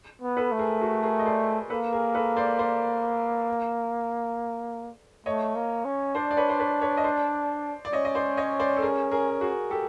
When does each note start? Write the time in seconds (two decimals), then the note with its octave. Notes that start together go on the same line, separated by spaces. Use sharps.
0.22 B3
0.37 A4 B4
0.52 A3
0.59 G#4 A#4
0.81 F#4 G#4
1.03 G#4 A#4
1.19 D#5
1.26 C5 D5
1.70 A#3 A4 B4
1.92 G#4 A#4
2.15 A4 B4
2.36 C5 D5
2.59 C5 D5
5.26 A3 C#5 D#5
5.55 A#3
5.85 C#4
6.15 D4 C5 D5
6.31 D5
6.37 B4 C#5
6.49 C5
6.59 B4 C#5
6.82 B4 C#5
6.97 D#5
7.04 C5 D5
7.85 D5
7.93 C#4 C#5 D#5
8.05 D#5
8.15 C5 D5
8.37 C#5 D#5
8.60 C5 D5
8.77 A4
8.82 G#4 A#4
9.11 G#4 A#4
9.41 F#4 G#4
9.70 G4 A4